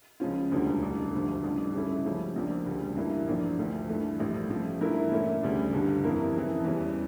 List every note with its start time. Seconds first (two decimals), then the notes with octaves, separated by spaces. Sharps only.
0.20 C#2 C#3 F3 C#4 F4
0.52 E1 D2 D3 G3 D4
0.82 A1 G2 D3 G3
1.13 D2 D3 F3 A3
1.44 A1 G2 D3 G3
1.74 C#3 G3 C#4 E4 A4
2.04 C#2 C#3 F3 A3 C#4
2.36 A#1 A#2 F3 A#3 D4
2.66 D2 C#3 G3
2.96 G2 E3 G3 A#3 E4
3.27 A#1 A2 F3 A#3 D4
3.58 D2 D3 F3 A3
3.89 G2 E3 A3
4.19 A#1 A2 G3
4.50 C#3 F3 A3
4.81 G2 E3 A3 E4 A#4
5.12 A#2 A3 C#4 E4 A4
5.42 D2 C#3 G3 D4
5.72 G1 G2 D3 G3
6.03 F2 E3 A#3 E4 A#4
6.35 F2 C#3 E3
6.65 E2 E3 G3 C#4